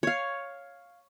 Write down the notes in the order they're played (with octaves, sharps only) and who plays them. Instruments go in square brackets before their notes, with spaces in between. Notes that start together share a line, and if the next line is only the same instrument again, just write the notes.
[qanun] C#5 F5